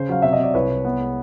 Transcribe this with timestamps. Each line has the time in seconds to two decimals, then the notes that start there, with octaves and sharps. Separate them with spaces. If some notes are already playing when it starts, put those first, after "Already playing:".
Already playing: C#3 C5
0.09 F#3 F5
0.22 C3 E5
0.33 D#5
0.39 C3 D5
0.54 C2 B4 C#5
0.70 C2
0.85 B3
1.00 G#3